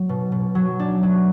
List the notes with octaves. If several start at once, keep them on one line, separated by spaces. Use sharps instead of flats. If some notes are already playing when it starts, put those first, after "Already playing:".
Already playing: F#3
B2
B2
F#3
D4
F#3